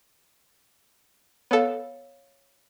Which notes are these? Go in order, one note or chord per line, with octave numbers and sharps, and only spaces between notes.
B3 A4 C#5 F5